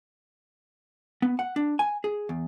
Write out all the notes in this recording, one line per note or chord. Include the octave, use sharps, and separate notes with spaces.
B3
F#5
D4
G#5
G#4
E2